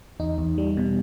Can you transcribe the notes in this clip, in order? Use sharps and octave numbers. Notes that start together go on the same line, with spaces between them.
E2 D#4
E2
G3
B2